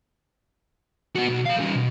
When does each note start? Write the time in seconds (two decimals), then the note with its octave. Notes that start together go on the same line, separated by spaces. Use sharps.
1.15 B3 F#4
1.29 B1 B2
1.45 A4 F5
1.59 G3 C#4
1.75 B2